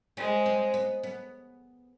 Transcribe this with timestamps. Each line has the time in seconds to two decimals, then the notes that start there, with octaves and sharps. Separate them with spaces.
0.17 G#3 C4
0.46 C4
0.74 B3
1.03 B3